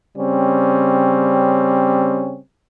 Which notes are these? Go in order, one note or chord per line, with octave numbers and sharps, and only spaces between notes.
C#3 G3 C4 C#4